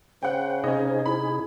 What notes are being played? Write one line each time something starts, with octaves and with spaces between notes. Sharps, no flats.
C#3 C5 F#5 G5
C3 C#4 D#4 G#4 D#5
E4 B5